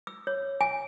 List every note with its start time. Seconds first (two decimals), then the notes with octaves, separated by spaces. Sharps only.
0.07 E6
0.27 C#5
0.61 G#5